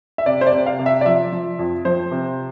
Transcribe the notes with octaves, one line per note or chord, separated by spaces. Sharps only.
E5
C3 D5
C5
D5
C3
F5
C3
E5
D5
F3 E5
F3
F2
F3 C5
C3